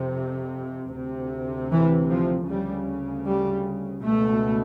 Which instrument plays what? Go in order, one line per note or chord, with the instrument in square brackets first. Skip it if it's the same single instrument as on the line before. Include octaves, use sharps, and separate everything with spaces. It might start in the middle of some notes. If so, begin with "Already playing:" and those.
Already playing: [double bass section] F2 C3
D2 C3
E3
F3
D2 C#3 G3
G3
C#2 B2 A3